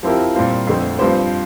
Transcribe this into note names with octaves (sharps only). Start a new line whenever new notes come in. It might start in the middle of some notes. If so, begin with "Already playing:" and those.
F3 C4 E4 G4 A#4
A#2 G3 C4 F4
F2 D3 A3 C4
G2 F3 C4 G4 C5